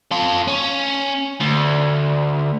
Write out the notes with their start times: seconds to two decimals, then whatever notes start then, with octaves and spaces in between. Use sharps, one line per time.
0.12 F4 A4
0.48 C#4
1.41 D2